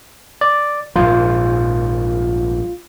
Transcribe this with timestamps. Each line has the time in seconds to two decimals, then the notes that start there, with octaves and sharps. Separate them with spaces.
0.41 D5
0.96 A#1 G#2 F3 F4